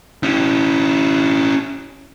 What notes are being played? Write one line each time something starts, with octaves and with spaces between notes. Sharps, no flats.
C#4 E4